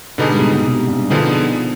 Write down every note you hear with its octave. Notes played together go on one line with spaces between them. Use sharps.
B2 D3 G3 B3 D#4 G#4
G#2
B2
B2
C3
G2
B2 D3 F3 B3 D#4 G#4